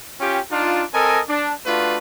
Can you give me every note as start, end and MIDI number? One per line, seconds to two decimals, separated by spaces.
0.20 0.38 61
0.20 0.38 65
0.20 0.38 67
0.20 0.38 79
0.50 0.82 62
0.50 0.82 63
0.50 0.82 65
0.92 1.19 60
0.92 1.19 69
0.92 1.19 70
0.92 1.19 75
0.92 1.19 80
1.27 1.51 62
1.65 1.96 57
1.65 1.96 62
1.65 1.96 65
1.65 1.96 66
1.65 1.96 71